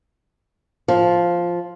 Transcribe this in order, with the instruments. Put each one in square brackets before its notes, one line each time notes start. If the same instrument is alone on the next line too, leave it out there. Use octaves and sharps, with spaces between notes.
[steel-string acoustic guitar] F3